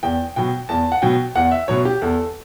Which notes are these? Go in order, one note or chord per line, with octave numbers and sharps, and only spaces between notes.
E2 G5
B2 F#3 G5
E2 A5
F#5
B2 F#3 G5
E2 F#5
E5
B2 F#3 C#5
G4
E2 A4